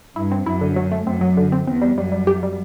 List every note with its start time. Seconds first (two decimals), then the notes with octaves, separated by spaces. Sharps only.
0.15 G2 E4
0.32 C4
0.46 F#2 E4
0.61 D3
0.76 F#3
0.91 A3
1.06 F#2 C4
1.21 F#3
1.37 D3
1.52 C4
1.67 E2 C4
1.82 G3
1.98 F#2 G3
2.12 G3
2.27 G4
2.43 G3